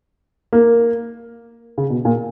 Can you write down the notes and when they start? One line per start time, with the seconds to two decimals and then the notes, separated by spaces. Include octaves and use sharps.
0.53 A#3
1.78 C#3
1.90 B2
2.05 A#2